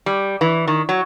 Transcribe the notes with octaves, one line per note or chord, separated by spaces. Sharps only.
G3
E3
D#3
F#3